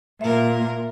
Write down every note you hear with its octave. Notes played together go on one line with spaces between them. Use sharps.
A#2 A#4 E5